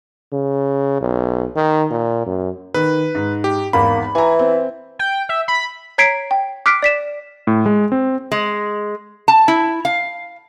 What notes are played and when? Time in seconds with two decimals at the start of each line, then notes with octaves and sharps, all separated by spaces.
0.33 C#3
1.01 B1
1.56 D#3
1.91 A#2
2.26 F#2
2.74 D#3 B4
3.15 G#2
3.44 G4
3.73 G#1 E2 A#3 B5
4.15 E3 G#5 A#5
4.39 C4
4.99 G5
5.29 E5
5.48 B5
5.98 C#5 A#5 G#6 B6 C7 D7
6.31 G5
6.66 D6 F6 F#6 B6 C7 D7
6.83 D5 B6 E7
7.47 A2
7.66 G#3
7.92 C4
8.32 G#3
9.28 A5
9.48 E4
9.85 F5